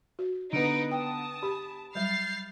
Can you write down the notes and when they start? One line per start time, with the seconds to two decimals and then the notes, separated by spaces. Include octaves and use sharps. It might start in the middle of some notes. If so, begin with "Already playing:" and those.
0.19 F#4
0.53 D3 B3 D#4 B4 D7
0.91 G5 A5 D#6
1.43 G4 B5
1.95 F#3 G3 F6 G6 A6 C7